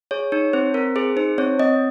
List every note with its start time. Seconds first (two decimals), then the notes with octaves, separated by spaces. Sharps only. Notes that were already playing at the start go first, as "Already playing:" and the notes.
0.11 G#4 C#5
0.32 D#4 C#5
0.53 C4 C5
0.74 C4 A#4
0.96 G#4 C5
1.17 D#4 C5
1.38 C4 C#5
1.59 C4 D#5